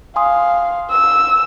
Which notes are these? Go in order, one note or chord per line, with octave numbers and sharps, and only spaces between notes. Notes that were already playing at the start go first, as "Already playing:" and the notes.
F5 G#5 C6 D#6
E6